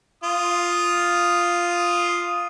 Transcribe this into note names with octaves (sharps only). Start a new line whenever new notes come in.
F4 D#6